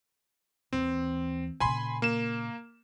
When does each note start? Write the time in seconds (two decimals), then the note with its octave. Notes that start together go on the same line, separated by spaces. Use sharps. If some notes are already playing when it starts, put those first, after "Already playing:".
0.73 D#2 E3 C4
1.60 A#2 C#3 G#5 B5 C6
2.02 A#3 E7